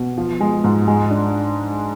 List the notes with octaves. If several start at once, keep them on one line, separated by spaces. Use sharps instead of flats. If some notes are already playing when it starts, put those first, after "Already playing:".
Already playing: B2
F3
G#3
G#2
G#3
D4